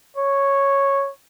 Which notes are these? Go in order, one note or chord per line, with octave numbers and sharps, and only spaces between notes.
C#5